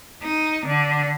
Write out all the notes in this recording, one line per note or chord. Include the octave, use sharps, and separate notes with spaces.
D#4
D3